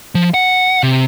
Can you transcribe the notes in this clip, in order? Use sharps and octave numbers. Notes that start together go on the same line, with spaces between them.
F3
F#5
C3